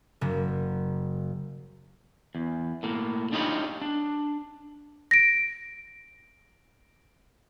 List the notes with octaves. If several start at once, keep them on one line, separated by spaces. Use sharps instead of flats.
F#1
E2
A2 A#3
D4 D#4 F4 G4 C#5 B5
D4
A#6 D7